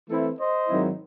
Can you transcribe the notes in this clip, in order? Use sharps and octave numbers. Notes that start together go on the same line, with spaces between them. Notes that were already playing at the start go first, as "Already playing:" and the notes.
E3 A3 C4 E4
C5 D#5
G#2 D#3 F#3 C4 E4